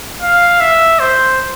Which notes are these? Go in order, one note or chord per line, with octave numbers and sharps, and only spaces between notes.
F5
E5
C5